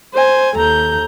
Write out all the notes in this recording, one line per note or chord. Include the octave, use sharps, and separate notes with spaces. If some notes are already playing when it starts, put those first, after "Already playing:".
C5 G#5
D#2 A4 A#5 G6